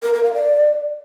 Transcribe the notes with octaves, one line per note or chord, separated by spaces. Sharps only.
A#4
A#4
F5
D5